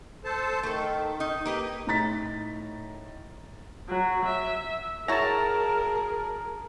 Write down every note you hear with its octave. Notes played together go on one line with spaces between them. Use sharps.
A4 C5 A5
D#3 A3 A4
D#4
A#3 G4 B4
A2 D#4 A#5 A6 B6
F#3
E5
F#3 E4 G#4 A#4 A5 A#5